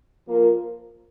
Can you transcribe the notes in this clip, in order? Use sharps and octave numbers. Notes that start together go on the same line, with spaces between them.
F3 A#3 F4 A#4